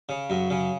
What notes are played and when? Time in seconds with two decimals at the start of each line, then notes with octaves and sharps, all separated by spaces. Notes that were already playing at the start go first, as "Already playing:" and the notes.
0.09 C#3
0.30 F#2
0.50 C#3